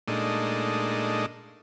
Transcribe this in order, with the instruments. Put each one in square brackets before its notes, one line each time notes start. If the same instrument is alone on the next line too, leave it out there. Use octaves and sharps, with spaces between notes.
[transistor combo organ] A#2 G#3 A3 D4 D#4